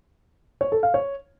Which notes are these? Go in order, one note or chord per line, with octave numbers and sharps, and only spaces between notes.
C#5
A4
F5
C#5